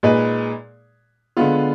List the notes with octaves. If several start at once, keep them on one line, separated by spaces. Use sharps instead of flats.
A#2 G#3 D#4 G#4 B4
D3 G#3 B3 F4